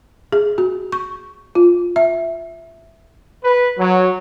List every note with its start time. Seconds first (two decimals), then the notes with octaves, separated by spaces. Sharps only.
0.33 G#4
0.58 F#4
0.92 C#6
1.55 F4
1.96 E5
3.44 B4
3.79 F#3